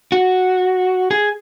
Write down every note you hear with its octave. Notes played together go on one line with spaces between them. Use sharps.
F#4
G#4